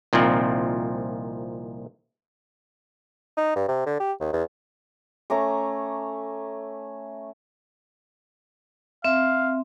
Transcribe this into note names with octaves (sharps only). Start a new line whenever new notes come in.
C2 A#2 D#3 F3 C4
D#4
G2
C3
D3
G4
D#2
E2
A3 C#4 A#5 D6
C4 E5 F5